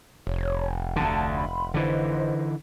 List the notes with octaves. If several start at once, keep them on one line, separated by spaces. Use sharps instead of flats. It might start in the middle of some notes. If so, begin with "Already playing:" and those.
F1 C#5
D2 D3 A5 A#5
B5 C6
D3 E3 B4 C5 D#5